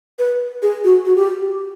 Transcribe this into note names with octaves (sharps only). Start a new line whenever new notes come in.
B4
G#4
F#4
F#4
G4